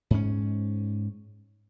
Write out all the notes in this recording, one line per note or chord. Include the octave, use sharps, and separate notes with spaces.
G#2 C#4